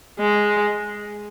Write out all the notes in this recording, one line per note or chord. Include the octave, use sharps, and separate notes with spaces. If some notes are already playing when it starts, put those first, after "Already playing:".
G#3